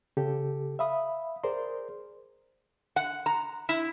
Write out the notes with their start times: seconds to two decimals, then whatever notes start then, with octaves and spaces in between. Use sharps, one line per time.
0.17 C#3 G4 A4
0.79 E5 F5 B5 D#6
1.43 G#4 A#4 C5 D5 C6
2.96 F#5
3.26 A#5
3.69 E4